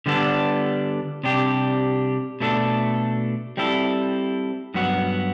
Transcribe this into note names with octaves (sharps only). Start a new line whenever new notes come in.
D3 G3 B3 D4 A4
C3 G3 D4 G4
B2 A3 D4 A4
G3 C4 E4 A4
G2 F#3 B3 F#4